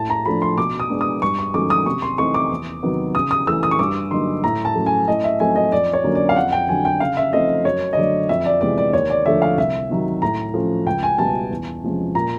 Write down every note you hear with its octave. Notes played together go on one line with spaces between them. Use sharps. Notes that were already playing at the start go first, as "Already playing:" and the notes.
Already playing: A2 A5
A#5
F3 A3 D4 B5
C6
B2 D6
D#6
G#3 B3 D4
D#6
G2 C#6
C#6
D#3 F#3 A3 C#4 D6
D#6
C3 C#6
C6
E3 A3 C4 D#4 C#6
D6
E2
C3 D#3 F#3 B3
C#3 D#6
D#6
E3 A3 E6
D#6
C#6
G2 D6
D3 F#3 A#3 D#4 C6
A2 A#5
A5
F#3 A3 C#4
G#5
A2 D#5
E5
F#3 A3 C4 D#4 G#5
D#5
F2 D5
C#5
D3 F#3 A#3 C#4
D5
F5
F2 F#5
G5
D3 F#3 G#5
G5
C#3 F5
E5
F3 A3 C4 D#4 D#5
F#2 C#5
D#5
D3 F#3 A3 D5
F2 E5
D5
C3 E3 G#3 B3 D5
D5
D#2 C#5
D5
D3 F3 A3 E5
F5
C2 E5
C3 D#3 F#3
A2 A#5
F3 A3 C#4
C#2 G5
G#5
B2 G3 B3 A5
E2
C3 F3 G#3 C#4
A#2 A#5